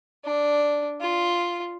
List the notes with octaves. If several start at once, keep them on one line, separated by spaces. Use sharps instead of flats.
D4
F4